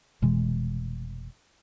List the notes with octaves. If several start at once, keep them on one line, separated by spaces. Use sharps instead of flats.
F1 B2 E3 G#3